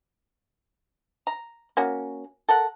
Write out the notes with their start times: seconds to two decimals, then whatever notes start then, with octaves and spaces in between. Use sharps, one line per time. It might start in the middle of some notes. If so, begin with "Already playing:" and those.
1.27 A#5
1.77 A#3 C#4 F#4
2.49 A4 A#4 F#5